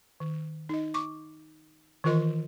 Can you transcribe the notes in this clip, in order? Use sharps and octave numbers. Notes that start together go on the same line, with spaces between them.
D#3
D#4 D#5
C#6 D6
D#3 E3 F4 A#4 D#5 C6